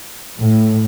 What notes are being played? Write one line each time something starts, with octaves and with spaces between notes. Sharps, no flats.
A2